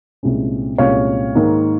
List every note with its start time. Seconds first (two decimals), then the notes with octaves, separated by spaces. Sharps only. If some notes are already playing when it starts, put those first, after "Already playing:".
0.23 C2 A#2 G#3 C#4
0.78 C2 A#2 G#3 C#4 C#5 F5
1.35 G#2 D#3 A#3